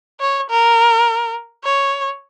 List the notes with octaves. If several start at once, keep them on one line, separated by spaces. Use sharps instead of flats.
C#5
A#4
C#5